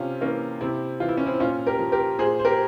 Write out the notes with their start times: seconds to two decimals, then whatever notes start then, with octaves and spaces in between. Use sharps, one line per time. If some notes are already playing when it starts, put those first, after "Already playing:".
Already playing: C3 C#4 F4
0.21 E3 A#3 C#4
0.61 C3 C4 E4
1.00 E3 F4
1.08 E4
1.17 C#4
1.26 C4 E4
1.40 A#2 C#4 F4
1.67 G4 A#4
1.79 F3
1.92 G4 A#4
2.19 A#2 G#4 C5
2.39 C5
2.45 G4 A#4